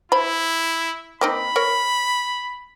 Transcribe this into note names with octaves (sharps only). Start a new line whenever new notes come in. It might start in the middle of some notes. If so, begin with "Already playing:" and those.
E4 C5 B5
A#3 C4 D#4 B5
A#4 C#5